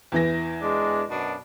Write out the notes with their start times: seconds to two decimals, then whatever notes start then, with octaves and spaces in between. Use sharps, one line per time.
0.12 E2 E3 A#6
0.62 G#3 D4
1.09 F#2 B2 D4